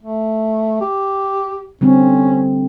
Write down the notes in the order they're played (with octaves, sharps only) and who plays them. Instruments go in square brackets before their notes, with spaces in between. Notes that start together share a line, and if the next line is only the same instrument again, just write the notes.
[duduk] A3
G4
[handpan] D3 G3 C4 [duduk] C#4